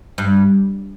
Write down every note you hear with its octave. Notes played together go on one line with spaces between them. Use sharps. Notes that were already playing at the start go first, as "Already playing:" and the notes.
G2